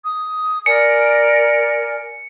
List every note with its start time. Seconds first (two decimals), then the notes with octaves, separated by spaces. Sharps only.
0.04 D#6
0.66 A#4 D5 G#5 C#7